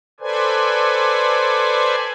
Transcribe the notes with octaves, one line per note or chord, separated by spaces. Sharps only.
A4 B4 C5 D5 G#5